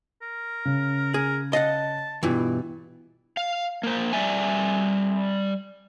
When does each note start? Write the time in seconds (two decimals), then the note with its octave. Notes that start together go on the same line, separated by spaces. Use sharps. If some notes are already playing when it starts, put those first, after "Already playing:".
0.22 A#4
0.65 C#3
1.14 G#4 A#4
1.53 D#5 F5 F#5 A5
2.23 G2 B2 E3 E4 F4
3.37 F5
3.83 A#3 C5
4.13 G3 D5 E5 G#5